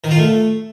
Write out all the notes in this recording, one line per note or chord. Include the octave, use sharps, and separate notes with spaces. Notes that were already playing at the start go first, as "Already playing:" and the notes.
D#3
F4
A3